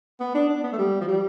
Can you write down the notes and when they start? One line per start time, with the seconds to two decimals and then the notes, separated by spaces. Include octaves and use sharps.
0.20 B3
0.35 D4
0.49 D4
0.63 B3
0.73 A3
0.78 G3
1.01 F3
1.08 G3